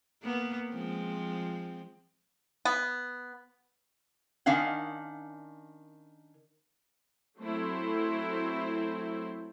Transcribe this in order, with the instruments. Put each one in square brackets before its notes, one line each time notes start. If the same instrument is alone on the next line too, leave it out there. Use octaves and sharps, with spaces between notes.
[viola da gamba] A#3 B3
F3 G#3 C4
[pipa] B3
[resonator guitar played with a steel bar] D#3 C#4 D4 F5 F#5
[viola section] F#3 A3 C4 E4 C5